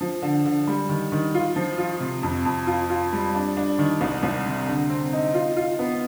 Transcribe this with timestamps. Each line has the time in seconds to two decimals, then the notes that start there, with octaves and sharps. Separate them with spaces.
0.01 F3
0.22 D3
0.45 D3
0.68 G3
0.89 D#3
1.12 D#3
1.34 F4
1.56 F3
1.78 F4
2.00 C3
2.23 F2
2.45 F2
2.67 F4
2.90 F4
3.13 G3
3.35 D4
3.57 D4
3.79 D#3
4.01 C2
4.23 C2
4.46 C3
4.68 D3
4.90 C4
5.12 D#4
5.34 F4
5.57 F4
5.79 B3